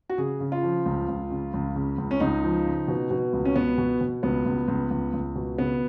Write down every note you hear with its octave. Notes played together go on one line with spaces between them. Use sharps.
F#4
C#3 G#4
C#3
F4
F3
C#2
C#2
C#3
C#2
C#3
C#2
C#4
C#2 D#4
F3
C#3
B2
B2
C#2
C#4
B2 B3
B2
B2
C#2 B3
C#2
C#2
C#2
C#2
B2
C#3 B3